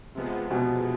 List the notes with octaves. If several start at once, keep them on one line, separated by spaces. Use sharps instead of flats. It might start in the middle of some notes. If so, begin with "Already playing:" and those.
C3 F3 G#3 B3
B2